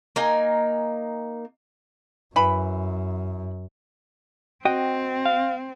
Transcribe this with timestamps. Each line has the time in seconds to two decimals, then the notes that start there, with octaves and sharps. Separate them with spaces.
0.16 A#3 D#4 G#5
2.36 F#2 E3 B5
4.65 C4 F#4 D#5 G5
5.25 F5